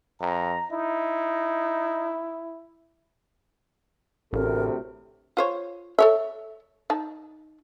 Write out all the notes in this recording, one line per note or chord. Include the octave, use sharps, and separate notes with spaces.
F2 A#5
D#4 E4
A1 D2 A2 C3 A4 A#4
F4 C5 C#5
A4 C#5 E5
D#4 A5